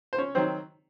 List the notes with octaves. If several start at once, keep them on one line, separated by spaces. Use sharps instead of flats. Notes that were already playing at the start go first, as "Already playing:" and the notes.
C5
C#4 C#5
D#3 F#3 C4 C5